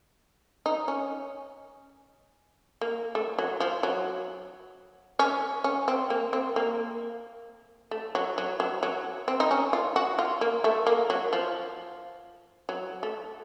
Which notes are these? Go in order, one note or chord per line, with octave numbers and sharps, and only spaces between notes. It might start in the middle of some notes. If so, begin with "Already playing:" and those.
D#4
C#4
A#3
A3
F#3
F3
F#3
C#4
C#4
C4
A#3
C4
A#3
A3
F#3
F#3
F#3
F#3
C4
D#4
C#4
F4
F#4
F4
A#3
A3
A#3
F#3
F3
F#3
A3